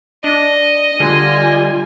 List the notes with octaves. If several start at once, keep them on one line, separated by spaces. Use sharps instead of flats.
D4 D#5
D3 G3 F4 G#5